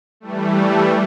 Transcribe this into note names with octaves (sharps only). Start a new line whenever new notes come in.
E3 G3 A3